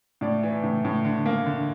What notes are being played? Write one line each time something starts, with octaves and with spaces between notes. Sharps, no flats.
A2 D5
E3
A2
A2
D3
A#3
D3